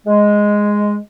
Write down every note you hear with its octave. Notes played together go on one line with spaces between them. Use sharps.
G#3